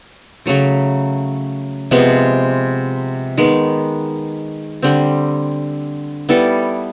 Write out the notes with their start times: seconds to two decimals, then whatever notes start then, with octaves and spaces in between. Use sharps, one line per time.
0.46 C#3 F#3 A3
1.91 C3 F3 G#3 B3
3.37 D#3 G#3 B3
4.82 D3 G3 C4
6.29 G3 B3 E4 A4